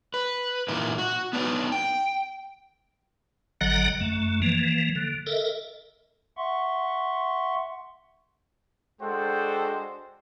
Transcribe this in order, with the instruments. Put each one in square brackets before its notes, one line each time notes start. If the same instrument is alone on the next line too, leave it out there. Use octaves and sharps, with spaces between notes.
[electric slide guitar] B4
A#2 E3 A#3 D#4
F#4
B3 D4 D#4 B4
G5
[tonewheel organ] G#1 D3 F#3 D#5 F#5 A#5
F#2 A3
E3 F3 A#3
D3
A4 A#4 D#5 E5
[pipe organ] E5 F#5 C6 C#6
[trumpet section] G#3 D4 F#4 A4 C5 G5